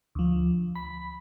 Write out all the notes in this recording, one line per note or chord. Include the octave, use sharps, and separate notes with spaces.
D2 F3
B5